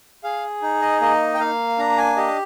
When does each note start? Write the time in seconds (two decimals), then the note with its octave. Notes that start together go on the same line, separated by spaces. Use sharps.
0.24 G#4 F5
0.62 D#4
0.82 D#5
1.01 A#3 D#5
1.34 G5
1.39 A#3 F5
1.78 D4 A#5
1.98 G#5
2.17 G4 D#5